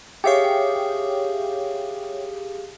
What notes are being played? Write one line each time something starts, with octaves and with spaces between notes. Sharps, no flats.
G4 G#4 C#5 E5 F5 G5